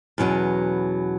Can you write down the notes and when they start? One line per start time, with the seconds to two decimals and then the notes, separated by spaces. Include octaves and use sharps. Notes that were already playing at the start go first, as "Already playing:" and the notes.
0.18 E2 B2 F#3 C#4